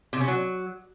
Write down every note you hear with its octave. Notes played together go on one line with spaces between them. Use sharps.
C3
C#4
F#3